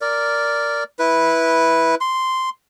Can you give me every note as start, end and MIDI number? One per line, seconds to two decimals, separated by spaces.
0.01 0.84 70
0.01 0.84 74
0.99 1.95 64
0.99 1.95 71
2.01 2.50 84